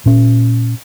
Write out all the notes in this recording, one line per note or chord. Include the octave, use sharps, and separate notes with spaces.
A#2 C#4